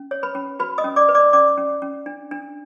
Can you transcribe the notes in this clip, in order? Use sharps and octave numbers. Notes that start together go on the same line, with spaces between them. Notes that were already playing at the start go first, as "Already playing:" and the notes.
Already playing: C#4
C#5
B4 B5
C#4
F#4 B4 B5
D#5 D#6
C#4
D5 D6
B4
D5 D6
C#4 D5 D6
C#4
C#4
D4
D4